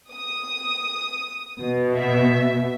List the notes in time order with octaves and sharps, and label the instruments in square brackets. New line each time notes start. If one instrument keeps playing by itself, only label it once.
[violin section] D#6
[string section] B2
[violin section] E5